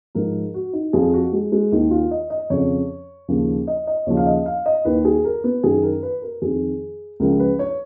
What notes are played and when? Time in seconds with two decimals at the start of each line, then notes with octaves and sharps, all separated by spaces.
0.15 G#2 F3 A#4
0.54 F#4
0.73 D#4
0.93 F2 F3 G#4
1.13 F#4
1.32 G#3
1.52 G#3
1.72 D#2 D#3 D#4
1.91 F4
2.11 D#5
2.30 D#5
2.50 F2 C#3 F3 C#5
3.28 D#2 C#3 F3
3.67 D#5
3.87 D#5
4.07 D#2 C#3 F3 C#5
4.17 F5
4.26 D#5
4.46 F5
4.66 D#5
4.85 D#2 D#3 B4
5.05 G#4
5.25 A#4
5.44 B3
5.63 F#2 D#3 G#4
5.83 A#4
6.03 B4
6.22 A#4
6.42 F2 D#3 G#4
7.20 C#2 C#3 F3 A#4
7.40 B4
7.59 C#5